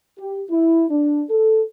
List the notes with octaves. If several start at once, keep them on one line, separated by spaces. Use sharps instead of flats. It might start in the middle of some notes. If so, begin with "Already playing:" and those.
G4
E4
D4
A4